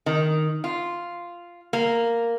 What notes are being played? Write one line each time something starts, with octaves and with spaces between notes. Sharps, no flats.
D#3
F4
A#3